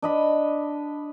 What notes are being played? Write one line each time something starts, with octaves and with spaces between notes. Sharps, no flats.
D4 D#5 B5